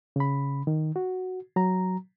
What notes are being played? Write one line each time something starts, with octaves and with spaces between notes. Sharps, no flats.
C#3 B5
D#3
F#4
F#3 A#5